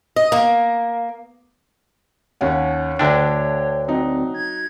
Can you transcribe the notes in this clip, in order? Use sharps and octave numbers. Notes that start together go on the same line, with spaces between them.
D#5
A#3
D#2 C#4 F#5
D2 D3 D4 C#5 G5
F#3 C4 D#4
G#6